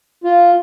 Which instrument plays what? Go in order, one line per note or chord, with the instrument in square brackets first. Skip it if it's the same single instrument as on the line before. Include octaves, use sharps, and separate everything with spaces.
[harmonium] F4